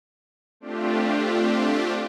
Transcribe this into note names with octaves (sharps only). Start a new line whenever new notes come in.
A3 C4 D4 F4 G4